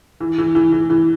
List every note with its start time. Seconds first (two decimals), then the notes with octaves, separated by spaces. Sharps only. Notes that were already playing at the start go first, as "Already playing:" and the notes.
0.21 E3
0.38 E3
0.55 E3
0.72 E3
0.90 E3